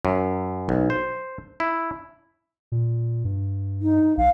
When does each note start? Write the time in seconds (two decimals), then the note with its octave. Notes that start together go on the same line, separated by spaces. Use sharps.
0.05 F#2
0.69 B1
0.90 C5
1.60 E4
2.72 A#2
3.25 G2
3.82 D#4
4.17 B1 F5